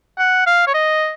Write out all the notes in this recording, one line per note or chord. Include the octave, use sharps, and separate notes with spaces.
F#5
F5
C#5
D#5